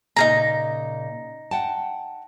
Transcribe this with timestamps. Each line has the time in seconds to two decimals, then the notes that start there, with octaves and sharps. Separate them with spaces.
0.16 A#2 C#3 D#4 G#4 A#5
1.51 F#5 G5 A5